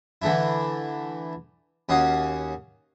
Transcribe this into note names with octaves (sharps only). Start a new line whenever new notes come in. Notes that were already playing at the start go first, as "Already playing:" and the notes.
D3 E3 A3 D4 E4
D#2 C#4 F#4 F5 D#6